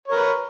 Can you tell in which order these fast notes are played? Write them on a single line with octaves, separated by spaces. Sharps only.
C#5 A#4 B4